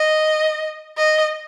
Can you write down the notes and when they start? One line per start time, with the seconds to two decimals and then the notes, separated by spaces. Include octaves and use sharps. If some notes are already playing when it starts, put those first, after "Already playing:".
Already playing: D#5
0.97 D#5